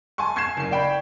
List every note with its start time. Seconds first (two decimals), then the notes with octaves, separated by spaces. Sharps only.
0.18 G#5 A5 C6 C#6
0.36 C#6 G#6 C7 E7
0.57 F#1 C7
0.71 D5 G5 B5